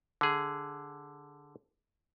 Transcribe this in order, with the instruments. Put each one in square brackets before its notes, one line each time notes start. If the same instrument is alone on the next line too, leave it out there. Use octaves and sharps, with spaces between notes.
[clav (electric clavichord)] D3 G#4